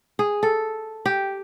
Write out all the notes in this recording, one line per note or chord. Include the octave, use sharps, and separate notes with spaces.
G#4
A4
G4